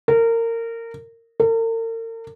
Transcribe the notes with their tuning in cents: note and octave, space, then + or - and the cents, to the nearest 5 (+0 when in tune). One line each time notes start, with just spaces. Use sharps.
A#4 -25
A#4 -45